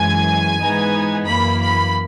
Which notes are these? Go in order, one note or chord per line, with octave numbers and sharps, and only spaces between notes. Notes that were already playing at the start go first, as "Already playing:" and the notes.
Already playing: F#2 E3 G#3 G#5
G#2 E3 B3 D#4
F#2 E3 A#3 B5
B5